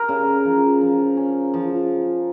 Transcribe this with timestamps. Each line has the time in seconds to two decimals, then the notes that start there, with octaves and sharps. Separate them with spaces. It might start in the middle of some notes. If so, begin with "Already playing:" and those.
Already playing: A#4
0.09 C#3
0.45 F3
0.81 F3
1.17 C#4
1.54 F3